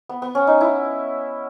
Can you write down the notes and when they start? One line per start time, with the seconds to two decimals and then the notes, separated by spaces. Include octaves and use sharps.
0.09 B3
0.22 B3
0.35 C#4
0.47 D#4
0.61 E4